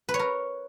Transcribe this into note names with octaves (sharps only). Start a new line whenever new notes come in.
B4
C#5
A#4